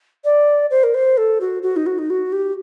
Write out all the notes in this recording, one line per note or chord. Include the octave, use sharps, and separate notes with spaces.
D5
C5
A#4
C5
A4
F#4
F#4
D#4
F#4
D#4
F#4
G4